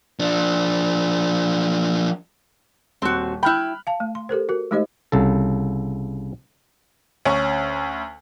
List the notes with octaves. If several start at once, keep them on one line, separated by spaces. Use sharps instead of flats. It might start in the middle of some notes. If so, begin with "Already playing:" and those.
F3 D4
D#1 C4 F#4
E4 G5 B5 F6 F#6
F5 G#5 A5
A3
C6
G4 A4 A#4 C5
F#4 A#4
G#3 A3 D#4 G4 C5 D#5
C2 C#3 A4
D2 C#4 C#6